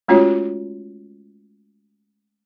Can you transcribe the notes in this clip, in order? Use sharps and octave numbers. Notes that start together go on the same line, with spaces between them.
G#3 A3 C#4 F4 F#4 C#5